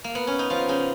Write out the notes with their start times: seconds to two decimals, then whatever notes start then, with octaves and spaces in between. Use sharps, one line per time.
0.04 A#3
0.15 B3
0.27 C#4
0.39 D#4
0.50 F3 F4
0.68 C#3 D#4